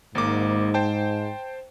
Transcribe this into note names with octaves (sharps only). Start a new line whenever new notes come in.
G#1 G#2 A#3 D6
C5 G5 A5